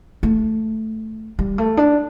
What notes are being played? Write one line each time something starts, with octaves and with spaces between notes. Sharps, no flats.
A3
G3
A3
D4